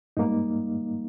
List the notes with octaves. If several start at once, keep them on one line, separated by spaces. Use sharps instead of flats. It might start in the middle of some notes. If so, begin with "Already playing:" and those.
G#2 G3 A#3 D#4